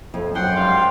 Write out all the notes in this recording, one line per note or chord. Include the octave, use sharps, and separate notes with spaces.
F2
F#2 F#5 G5 C6
G#2 G3 F5 C6